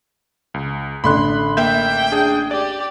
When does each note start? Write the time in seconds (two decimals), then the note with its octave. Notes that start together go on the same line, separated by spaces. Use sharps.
0.54 C#2
1.04 A1 D3 B5 C6 F#6
1.57 A#3 E5 G5 G6
2.12 D4 G#4
2.51 G4 D5